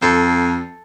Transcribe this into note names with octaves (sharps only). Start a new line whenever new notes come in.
F2 A4